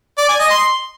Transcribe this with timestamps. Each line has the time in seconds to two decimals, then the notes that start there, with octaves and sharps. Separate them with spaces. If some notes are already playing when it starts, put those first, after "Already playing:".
0.18 D5
0.29 G#5
0.40 D#5
0.50 C6